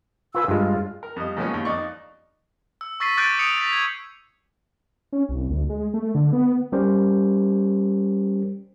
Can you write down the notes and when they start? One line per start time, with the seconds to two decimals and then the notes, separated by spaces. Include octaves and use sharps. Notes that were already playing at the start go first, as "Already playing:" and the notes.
0.35 F4 B4 G#5 E6
0.48 G2 G#3 F4
1.03 A#4
1.16 F2 G3 D#5
1.36 A#2 C#3 F3 G#3 B3 C#4
1.54 D#2
1.65 F2 D#4 D5 C#6
2.81 E6
3.00 C#6 E6 A6 B6 C7 D#7
3.17 D6 F#6 G6 A6 D7 D#7
3.39 D#6 C#7 D7 F7
3.57 A6 B6 F7
3.72 G#6
5.13 C#4
5.29 C2
5.50 D2
5.69 G#3
5.94 A3
6.15 D3
6.33 B3
6.72 G3 C#4 G4 A#4 C5